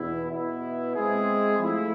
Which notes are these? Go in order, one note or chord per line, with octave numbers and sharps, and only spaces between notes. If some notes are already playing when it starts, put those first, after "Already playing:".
Already playing: E2 B2 B3 E4
B2 B3 E4
G#3 C4 E4 G#4
F3 A3 E4